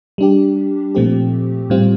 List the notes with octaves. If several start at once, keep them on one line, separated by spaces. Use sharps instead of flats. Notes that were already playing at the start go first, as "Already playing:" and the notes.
G3 D4 G4
A#2 F3 A3 C4 G4
A2 G3 C4 F4